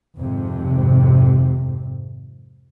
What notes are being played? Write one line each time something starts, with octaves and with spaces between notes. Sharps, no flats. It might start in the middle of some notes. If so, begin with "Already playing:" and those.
G#1 F2 C3